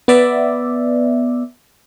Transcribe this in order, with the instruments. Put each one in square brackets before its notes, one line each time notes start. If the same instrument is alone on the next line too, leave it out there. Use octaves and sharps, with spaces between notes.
[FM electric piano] B3 D5 E5